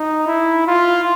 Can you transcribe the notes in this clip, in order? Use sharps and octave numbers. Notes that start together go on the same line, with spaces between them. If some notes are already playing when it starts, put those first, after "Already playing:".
Already playing: D#4
E4
F4